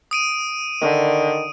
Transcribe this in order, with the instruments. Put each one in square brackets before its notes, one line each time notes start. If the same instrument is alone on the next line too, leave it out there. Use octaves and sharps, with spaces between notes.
[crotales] D#6 D7 D#7
[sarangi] D3 [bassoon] D#3